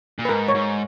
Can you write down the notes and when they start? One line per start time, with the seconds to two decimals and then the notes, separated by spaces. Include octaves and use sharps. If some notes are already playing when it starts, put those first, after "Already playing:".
0.19 A#2
0.25 B4
0.29 G#2 A#4
0.48 C#5
0.55 G#2